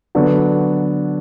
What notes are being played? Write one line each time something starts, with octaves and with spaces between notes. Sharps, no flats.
D3 F#3 B3 D4 F#4